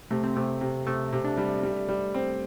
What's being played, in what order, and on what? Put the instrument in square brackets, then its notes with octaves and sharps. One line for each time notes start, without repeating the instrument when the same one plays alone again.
[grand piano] C3 [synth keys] A3
[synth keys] C4
[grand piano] C3 [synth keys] A3
[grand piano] C3
[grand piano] C3 [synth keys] A3
[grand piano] C3
[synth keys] D4
[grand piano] G3
G3
G3
C4